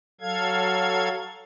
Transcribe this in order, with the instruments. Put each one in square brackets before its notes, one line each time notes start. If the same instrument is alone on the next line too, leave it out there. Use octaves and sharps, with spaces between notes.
[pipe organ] F#3 A4 F5 G#6